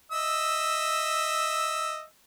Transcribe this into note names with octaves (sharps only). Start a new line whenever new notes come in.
D#5 E5 E6